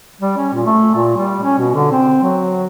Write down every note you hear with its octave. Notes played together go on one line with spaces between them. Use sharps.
G3
C#4
A#2
A3
A#2
G3
C#4
B2
D3
C4
F#3